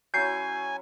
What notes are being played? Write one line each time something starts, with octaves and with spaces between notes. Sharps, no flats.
F#3 C#4 E4 G#5 G6 C7